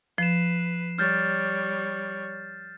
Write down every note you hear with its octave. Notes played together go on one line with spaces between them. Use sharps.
F3 B4 C7 E7
G3 C#5 F6 G6 A6